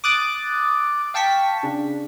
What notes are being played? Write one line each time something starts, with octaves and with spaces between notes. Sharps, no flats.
D6 D#6 F#6 A6 D7
F5 G5 A5 C#6 B6
C#3 D4